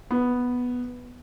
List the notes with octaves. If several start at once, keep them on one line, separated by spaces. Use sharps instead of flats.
B3